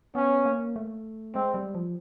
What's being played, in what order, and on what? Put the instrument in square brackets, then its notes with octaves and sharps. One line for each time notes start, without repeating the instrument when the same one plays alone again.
[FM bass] B3 [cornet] C#4
[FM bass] A#3
A3
[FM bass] G#3 [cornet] C4
[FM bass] G3
F3